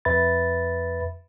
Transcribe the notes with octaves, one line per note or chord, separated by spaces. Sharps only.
F2 B4 E5 B5 A6